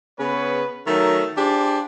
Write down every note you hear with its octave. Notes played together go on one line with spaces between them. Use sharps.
C#3 B3 C#4 G#4 B4 C#5
D#3 F#3 A3 D#4 A#4
D4 F4 G4 G#4 C5 D5